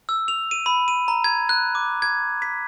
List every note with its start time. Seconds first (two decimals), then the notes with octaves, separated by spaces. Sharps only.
0.09 E6
0.28 F7
0.51 D#7
0.66 B5
0.88 D#7
1.08 A#5
1.24 G#6
1.49 F#6
1.75 D6
2.02 G#6
2.42 B6